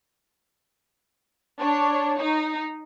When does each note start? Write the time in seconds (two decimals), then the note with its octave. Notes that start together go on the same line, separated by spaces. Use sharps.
1.60 D4 C#5
2.19 D#4